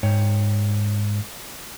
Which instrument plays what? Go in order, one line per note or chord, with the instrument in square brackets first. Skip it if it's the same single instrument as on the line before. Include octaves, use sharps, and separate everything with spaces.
[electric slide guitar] G#2 C#5 G5